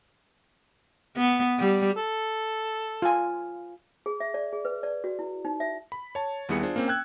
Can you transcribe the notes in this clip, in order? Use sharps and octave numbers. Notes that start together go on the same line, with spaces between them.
B3
G3
A4
F4 G#5
G#4
E5
D5
G#4
B4
D5
F#4
E4
D#4
E5
B5
C#5 A5
D#2 G3 B3 E4 G#4 C#7
D4 F4 G#4 C5
A#3 C4 C#4
G5 E6 F#6 G#6